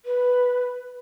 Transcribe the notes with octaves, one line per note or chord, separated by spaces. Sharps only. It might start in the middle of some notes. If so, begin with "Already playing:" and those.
B4